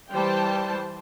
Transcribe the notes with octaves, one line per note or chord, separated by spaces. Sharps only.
E3 G3 C5 G5 A5